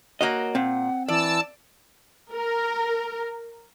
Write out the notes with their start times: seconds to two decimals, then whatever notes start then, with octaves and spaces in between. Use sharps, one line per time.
0.21 A#3 F#4 C#5 D#5
0.55 A#2 C4 F#5
1.08 E3 D5 A5 E6
2.31 A#4